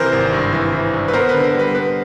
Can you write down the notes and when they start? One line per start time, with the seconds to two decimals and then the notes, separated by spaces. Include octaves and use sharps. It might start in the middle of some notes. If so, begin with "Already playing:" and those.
Already playing: C3 E3 A#4 C5
0.12 G#1
0.32 G2
0.53 E3
0.73 E3
0.93 G2
1.08 B4
1.13 B3 A#4 C5
1.29 D3 B4
1.44 A#4
1.54 G3
1.59 B4
1.75 B3 B4